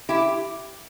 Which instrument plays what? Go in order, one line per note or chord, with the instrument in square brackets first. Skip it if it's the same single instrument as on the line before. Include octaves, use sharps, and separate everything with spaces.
[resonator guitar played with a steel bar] E4 G4